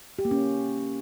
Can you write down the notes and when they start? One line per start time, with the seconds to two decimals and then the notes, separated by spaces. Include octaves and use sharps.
0.19 G4
0.25 A#3
0.31 C#4